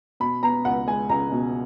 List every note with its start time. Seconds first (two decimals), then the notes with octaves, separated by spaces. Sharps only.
0.20 B2 B5
0.42 B3 A#5
0.65 C#2 F#5
0.87 G#3 G#5
1.09 C#2 A#5
1.32 B2